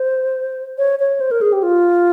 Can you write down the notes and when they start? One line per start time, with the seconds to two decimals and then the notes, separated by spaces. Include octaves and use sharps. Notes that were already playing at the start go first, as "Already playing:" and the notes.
Already playing: C5
0.78 C#5
0.99 C#5
1.21 C5
1.31 A#4
1.41 G#4
1.53 G4
1.63 F4